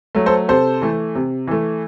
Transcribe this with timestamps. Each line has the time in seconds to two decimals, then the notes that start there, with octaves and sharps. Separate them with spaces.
0.15 F#3 A3
0.26 A4 C5
0.48 C3 A4 C5
0.82 E3 A3
1.15 C3
1.47 E3 A3